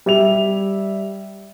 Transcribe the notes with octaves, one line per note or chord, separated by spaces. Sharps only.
G3 E5 F7